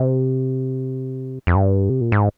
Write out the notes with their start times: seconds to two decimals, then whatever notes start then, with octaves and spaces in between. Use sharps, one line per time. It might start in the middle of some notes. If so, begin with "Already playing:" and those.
Already playing: C3
1.47 F2
1.55 G2
1.89 C3
2.01 A#2
2.12 G#2